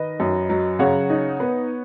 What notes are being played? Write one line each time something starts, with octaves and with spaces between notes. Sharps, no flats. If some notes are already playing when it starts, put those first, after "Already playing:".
Already playing: D#3 B4 D#5
F#2
F#3
C#3 C#5 F#5
D#4
B3